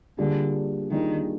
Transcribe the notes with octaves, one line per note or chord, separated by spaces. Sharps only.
D3 G3 A#3 D4 F4 G#4
D#3 G3 A#3 D4 F4 G#4